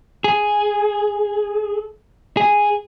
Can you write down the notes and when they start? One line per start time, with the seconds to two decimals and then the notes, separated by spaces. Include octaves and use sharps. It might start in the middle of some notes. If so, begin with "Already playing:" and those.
0.24 G#4
2.37 G#4